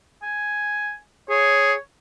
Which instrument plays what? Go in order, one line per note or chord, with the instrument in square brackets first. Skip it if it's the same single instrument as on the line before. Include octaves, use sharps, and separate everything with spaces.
[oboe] G#5
[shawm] G#4 [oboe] C#5